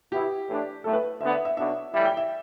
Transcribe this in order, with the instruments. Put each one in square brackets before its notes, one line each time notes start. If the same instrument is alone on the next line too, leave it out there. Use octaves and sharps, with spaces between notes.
[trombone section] B2 B3 E4 [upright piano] G4
[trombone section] A2 E3 A3 D4
[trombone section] B1 A2 A3 [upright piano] A4
[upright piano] B4
[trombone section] D2 D3 B3 D4 [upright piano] E5
[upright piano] E5
E5
[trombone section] B1 B2 B3 D4 [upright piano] E5
[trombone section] A2 E3 G3 E4 [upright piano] E5
[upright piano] G5
E5